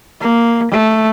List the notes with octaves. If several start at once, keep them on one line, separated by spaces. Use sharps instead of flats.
A#3
A3